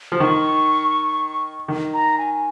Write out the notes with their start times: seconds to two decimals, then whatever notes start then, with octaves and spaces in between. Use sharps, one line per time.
0.12 F3
0.20 D#3 C#6
1.68 D#3
1.94 A#5
2.18 G#5